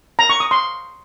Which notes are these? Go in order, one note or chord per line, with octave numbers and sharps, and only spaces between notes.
A#5
C#6
D#6
C6